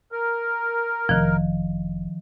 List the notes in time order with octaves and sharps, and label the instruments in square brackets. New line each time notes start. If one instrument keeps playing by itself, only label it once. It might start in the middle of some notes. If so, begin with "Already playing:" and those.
[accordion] A#4
[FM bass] F1 [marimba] D#3 F3